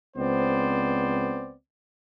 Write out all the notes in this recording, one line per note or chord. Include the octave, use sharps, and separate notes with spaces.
C#2 B3 C4 C5 D5